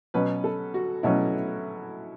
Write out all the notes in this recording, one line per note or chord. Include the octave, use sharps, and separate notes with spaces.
B2 F#3 C#4 B4
A4
F#4
B2 F#3 C#4 E4